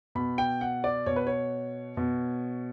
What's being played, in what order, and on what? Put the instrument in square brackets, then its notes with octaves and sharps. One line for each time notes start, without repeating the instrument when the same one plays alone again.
[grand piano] B2 B5
G5
F#5
D5
B2 C#5
B4
C#5
B2